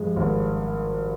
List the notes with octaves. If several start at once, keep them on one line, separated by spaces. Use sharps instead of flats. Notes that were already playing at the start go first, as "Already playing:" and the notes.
Already playing: G2 F3 G#3
G#1